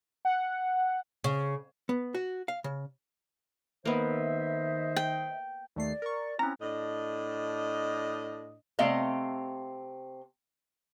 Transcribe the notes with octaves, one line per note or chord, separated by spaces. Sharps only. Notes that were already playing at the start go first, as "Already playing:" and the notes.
F#5
C#3
B3
F#4
F5
C#3
D#3 A#3 B3 C5 D#5 E5
G5
D#2 A3 D5 C7
A#4 C#6
C4 C#4 E4 A#5
A2 D4 D#5
C3 A3 C4 D#5 F5